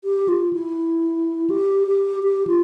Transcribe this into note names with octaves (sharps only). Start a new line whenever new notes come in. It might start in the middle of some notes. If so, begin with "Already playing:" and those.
G4
F4
E4
G4
G4
G4
F4